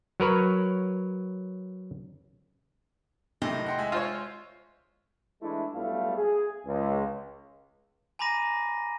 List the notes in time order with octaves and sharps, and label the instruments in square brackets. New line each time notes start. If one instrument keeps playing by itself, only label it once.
[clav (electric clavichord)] F#3 A#4 B4 C#5
[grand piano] A2 D#3 [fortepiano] C3 A3 [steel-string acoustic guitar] D#5
[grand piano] F#5 G5 C6
G#3 G#4 E5
[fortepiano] F4 C5 C#5
[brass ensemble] E3 G#3 A3 D4 E4
B1 G3 A3 B3 F4 F5
G#4
C#2
[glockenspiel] G#5 A#5 B5 D6 A#6 D#7